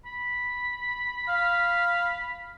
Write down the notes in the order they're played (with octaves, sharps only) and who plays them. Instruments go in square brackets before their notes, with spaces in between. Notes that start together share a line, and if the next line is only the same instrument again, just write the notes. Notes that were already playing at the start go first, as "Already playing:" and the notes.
[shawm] B5
[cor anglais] F5